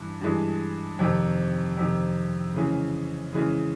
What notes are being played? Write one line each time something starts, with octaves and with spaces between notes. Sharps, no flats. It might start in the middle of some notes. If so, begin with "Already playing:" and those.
Already playing: G2 E3
G2 E3 G#3
F2 C3 D#3
F2 C3 D#3
C#3 E3 G#3 C#4
C#3 E3 G#3 C#4